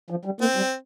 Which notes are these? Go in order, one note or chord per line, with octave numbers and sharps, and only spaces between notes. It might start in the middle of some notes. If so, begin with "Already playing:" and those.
F3
G3
A#3 C4
G3